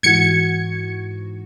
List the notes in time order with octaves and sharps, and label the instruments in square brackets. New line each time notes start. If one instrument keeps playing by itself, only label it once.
[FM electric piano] G#2 E3 F#4 [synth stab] G#6 C#7